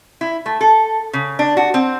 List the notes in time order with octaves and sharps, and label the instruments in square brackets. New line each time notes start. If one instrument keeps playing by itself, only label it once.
[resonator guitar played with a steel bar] E4
A3
A4
C#3
D4
F#4
C4